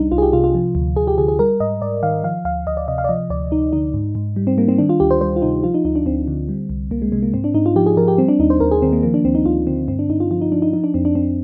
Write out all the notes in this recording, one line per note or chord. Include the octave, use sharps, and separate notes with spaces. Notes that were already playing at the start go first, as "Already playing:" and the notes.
Already playing: C2 G3 D4 D#4
C2 F4
G#4
G4
C3 F4
F4
F3
D2
D2 G#4
G4
D3 G#4
G#4
G3 A#4
G#2 D#5
G#2 D5
D#3 F5
F3 F5
D2 F5
D2 D#5
D5
C3 D#5
F5
D5
F3 D#5
D2 D5
D2 D#4
D3 D#4
G#2
G#2
G3
C4
G3 A#3
C4
D#3 D4
F4
D2 G4
C5
G3 C5
F4
C3 D#4
F3 F4
D#4
D2 D#4
D4
D2 C4
D3
G3
C2
C2 A#3
G#3
C3 G#3
A#3
G#2 C4
D4
G#2 D#4
F4
F3 G4
G#4
F3 A#4
G4
G3 C4
D4
D#2 D#4
C5
D#2 A#4
G#4
D#3 C4
A#3
F3 A#3
D4
D2 C4
D#4
D2 F4
D3 C4
G2 C4
D4
G2 D#4
F4
F3 F4
D#4
F3 D4
D#4
F3 D#4
D4
F2 C4
D4
F2 C4